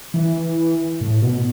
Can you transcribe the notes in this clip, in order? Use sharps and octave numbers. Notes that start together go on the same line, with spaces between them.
E3
A2
B2